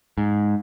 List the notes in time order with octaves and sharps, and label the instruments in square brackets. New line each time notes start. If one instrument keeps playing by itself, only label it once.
[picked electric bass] G#2